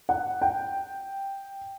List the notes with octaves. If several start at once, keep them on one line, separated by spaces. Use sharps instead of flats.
F#5
G5